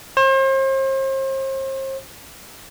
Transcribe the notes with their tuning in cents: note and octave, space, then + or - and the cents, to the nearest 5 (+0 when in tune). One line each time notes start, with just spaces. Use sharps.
C5 +40